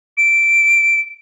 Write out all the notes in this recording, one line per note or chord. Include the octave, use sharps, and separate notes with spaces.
D7